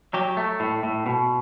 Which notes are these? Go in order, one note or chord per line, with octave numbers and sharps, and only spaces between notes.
F#3 G4
A3
A2
A2
B2